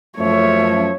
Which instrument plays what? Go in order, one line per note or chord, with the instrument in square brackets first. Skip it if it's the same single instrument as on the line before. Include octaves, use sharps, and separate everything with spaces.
[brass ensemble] F#2 F3 A3 [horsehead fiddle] C#5 E5